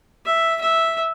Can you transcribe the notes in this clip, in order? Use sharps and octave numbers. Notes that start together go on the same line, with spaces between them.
E5
E5